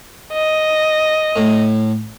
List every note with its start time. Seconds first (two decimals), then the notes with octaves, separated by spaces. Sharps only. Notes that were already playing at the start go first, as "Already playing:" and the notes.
0.33 D#5
1.36 A2